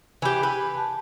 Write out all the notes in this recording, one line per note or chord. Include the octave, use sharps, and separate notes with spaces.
E3 G4 G#5 B5 G6
B4
A5